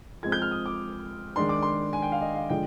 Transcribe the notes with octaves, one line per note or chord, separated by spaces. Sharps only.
F3 G#3 C4 G#6
G6
F6
D#6
D6
D#3 G#3 D4 C6
D6
C6
G#5
G5
F5
D#5
F5
D3 F3 G#3 D4 G5